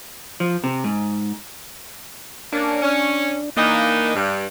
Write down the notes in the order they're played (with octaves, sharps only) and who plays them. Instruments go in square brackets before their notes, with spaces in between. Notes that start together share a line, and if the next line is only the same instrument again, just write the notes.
[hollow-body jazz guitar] F3
C3
G#2
[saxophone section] A#3 C#4 [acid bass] D4
[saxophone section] C#4
[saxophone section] E3 D4 D#4 [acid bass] A#3
[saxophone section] G2